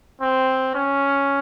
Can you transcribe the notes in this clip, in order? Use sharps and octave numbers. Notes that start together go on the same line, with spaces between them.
C4
C#4